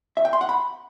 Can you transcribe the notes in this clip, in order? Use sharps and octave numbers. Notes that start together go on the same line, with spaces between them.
E5
G5
C6
F#5
B5